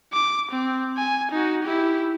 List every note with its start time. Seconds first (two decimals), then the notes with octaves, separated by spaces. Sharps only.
0.13 D6
0.51 C4
0.98 G#5
1.31 D#4 F#4
1.63 E4 G4